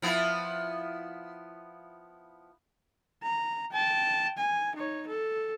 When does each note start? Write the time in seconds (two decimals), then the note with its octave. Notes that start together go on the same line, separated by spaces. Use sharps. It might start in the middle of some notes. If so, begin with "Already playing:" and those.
0.02 F3 B3 E4
3.23 A#5
3.72 G5 A5
4.38 G#5
4.76 D#4 C#5
5.07 A4